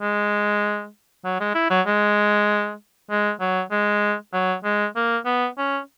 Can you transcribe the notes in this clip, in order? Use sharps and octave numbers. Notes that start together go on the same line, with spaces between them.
G#3
F#3
G#3
E4
F#3
G#3
G#3
F#3
G#3
F#3
G#3
A#3
B3
C#4